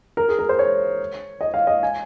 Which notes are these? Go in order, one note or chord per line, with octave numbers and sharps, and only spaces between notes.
A#4
G#4
A#4
C5
C#5
D#5
F5
D#5
G#5